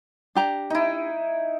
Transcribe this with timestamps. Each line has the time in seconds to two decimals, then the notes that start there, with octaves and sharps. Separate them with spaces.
0.35 D4 G4 A#5
0.70 D#4 E4